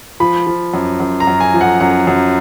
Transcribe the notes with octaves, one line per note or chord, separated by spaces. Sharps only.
F3 B5
F3
F#2
F#2
A#5
F#2
G#5
F3
F#5
F#2 F#5
F#2